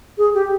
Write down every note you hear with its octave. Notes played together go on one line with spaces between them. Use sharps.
G#4
G4